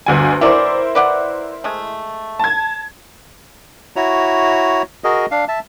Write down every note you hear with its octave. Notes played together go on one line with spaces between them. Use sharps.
G1 D2 G#5
E3 F#3 E4 A#4 C5 D5
B4 D5 F#5
G#3 A3
A5 G#6
E4 F#4 C#5 A#5
F#4 G#4 A#4 D#5
D4 F5
E5 A5